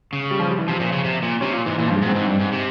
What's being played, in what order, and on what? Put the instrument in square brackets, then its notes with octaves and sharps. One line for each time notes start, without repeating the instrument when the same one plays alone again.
[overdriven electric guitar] C#3
[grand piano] G3
F3
G3
E3
[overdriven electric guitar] C3 [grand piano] F3
[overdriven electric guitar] A#2
C#3
C3
A#2
[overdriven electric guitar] C3 [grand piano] C#4
[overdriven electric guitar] A#2
[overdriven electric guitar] G#2 [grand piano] E3
[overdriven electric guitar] A#2 [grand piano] E3
[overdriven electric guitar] G2 [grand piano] F3
[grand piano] G#3
[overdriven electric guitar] G#2
[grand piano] C4
[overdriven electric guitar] G#2
G2
G#2
C3